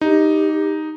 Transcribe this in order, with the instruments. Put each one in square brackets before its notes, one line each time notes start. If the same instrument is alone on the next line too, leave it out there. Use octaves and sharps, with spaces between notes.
[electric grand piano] D#4 [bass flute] G4